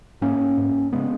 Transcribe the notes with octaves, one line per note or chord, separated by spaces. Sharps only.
G#2 A#3 C#4
G#2
C#3 G#3 B3